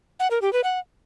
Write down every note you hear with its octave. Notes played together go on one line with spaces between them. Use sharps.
F#5
A#4
G4
B4
F#5